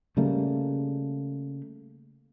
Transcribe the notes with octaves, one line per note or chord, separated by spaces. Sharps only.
C#3 G3 A3 A#3